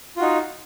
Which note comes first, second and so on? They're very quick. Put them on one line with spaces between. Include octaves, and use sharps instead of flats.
F4 F#4 D#4